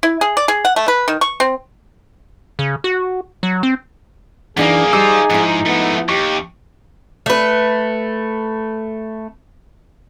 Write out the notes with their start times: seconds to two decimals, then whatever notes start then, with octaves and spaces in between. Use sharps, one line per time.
0.03 E4
0.21 G#4
0.37 D5
0.48 G#4
0.65 F#5
0.76 A3
0.88 B4
1.08 D#3
1.21 C#6
1.40 C4
2.59 C#3
2.84 F#4
3.43 F#3
3.63 C4
4.57 F#2 E3 A#3 D4 D#4 G#4
4.93 G3 D#4 F4 C5 D6 E6
5.30 G#2 F3 E4
5.66 G#2 A3 B3
6.09 D#2 G4 C#6
7.26 A3 B4